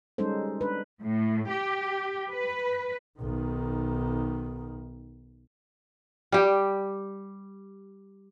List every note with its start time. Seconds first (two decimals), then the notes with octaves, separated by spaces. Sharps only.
0.18 G3 G#3 C#4 D#4 A4 C5
0.61 D4 B4
1.03 A2
1.51 G4
2.30 B4
3.19 B1 D#3
6.32 G3 G4